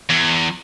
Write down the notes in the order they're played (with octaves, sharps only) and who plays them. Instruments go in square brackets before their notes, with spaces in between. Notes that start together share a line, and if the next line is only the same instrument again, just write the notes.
[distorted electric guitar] E2